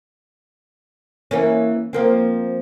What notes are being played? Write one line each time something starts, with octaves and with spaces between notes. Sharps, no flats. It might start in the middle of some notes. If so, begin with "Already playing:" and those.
E3 A#3 C#4
F3 A#3 C4